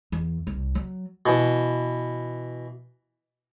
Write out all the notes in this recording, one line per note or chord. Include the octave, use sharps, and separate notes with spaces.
E2
C2
F#3
B2 E3